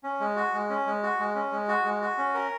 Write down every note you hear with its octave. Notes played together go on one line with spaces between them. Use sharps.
C#4
G#3
F#4
G#3
C#4
G#3
F#4
G#3
C#4
G#3
F#4
G#3
F#4
C#4
A#4